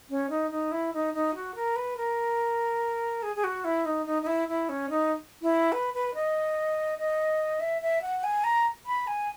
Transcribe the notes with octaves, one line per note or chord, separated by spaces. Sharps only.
C#4
D#4
D#4
E4
D#4
D#4
F#4
A#4
B4
A#4
G#4
G#4
F#4
E4
D#4
D#4
D#4
E4
E4
C#4
D#4
E4
B4
B4
D#5
D#5
E5
E5
F#5
G#5
A#5
B5
G#5